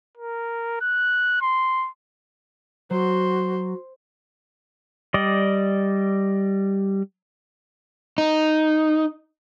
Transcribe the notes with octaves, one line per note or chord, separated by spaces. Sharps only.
A#4
F#6
C6
F#3 F#4 C5
G3 D5 D#5
D#4